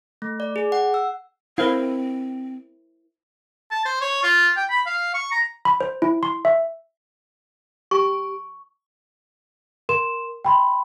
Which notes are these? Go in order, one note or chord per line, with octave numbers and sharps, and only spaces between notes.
A3
D5
G#4
F#5
E6
C4 E4 A#4 C5 F5
A5
C5
C#5
F4
G5
B5
F5
C#6
A#5
B5
C5
E4
C6
E5
G4 C#6
A#4 C6 E7
G5 B5 C6